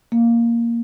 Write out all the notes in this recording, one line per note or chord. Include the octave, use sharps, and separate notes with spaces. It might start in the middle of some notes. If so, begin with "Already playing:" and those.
A#3